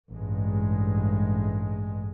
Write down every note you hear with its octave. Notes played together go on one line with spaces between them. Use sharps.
A1 G2 G#3